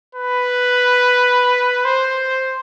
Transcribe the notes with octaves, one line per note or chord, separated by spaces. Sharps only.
B4
C5